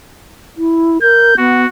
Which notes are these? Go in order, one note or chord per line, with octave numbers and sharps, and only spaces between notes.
E4
A#4 G6
B3 F#4